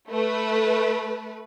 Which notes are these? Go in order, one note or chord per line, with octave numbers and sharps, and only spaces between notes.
A3 B4